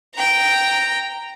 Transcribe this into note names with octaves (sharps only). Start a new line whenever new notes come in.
G5 A#5